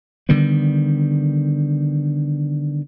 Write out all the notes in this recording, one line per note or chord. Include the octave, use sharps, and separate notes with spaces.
D3 D#3 G3 B3